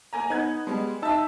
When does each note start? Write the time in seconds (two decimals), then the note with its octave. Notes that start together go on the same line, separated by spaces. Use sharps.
0.13 A#3 G#5 A#5
0.30 B3 D#4 G#6
0.67 G3 G#3 B3
1.02 D#4 E5 A5 E6